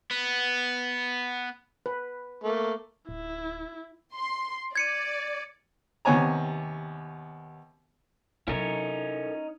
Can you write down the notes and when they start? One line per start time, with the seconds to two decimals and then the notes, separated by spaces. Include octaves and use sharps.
0.11 B3
1.86 B4
2.44 A3 A#3
3.09 D1 E4
4.15 C6
4.75 D5 G#6 C#7 D#7
6.05 D#2 C3 B3 C#5 G#5 A#5
8.48 C3 F#3 C#4 D#4 E4 A4 A#4 C#5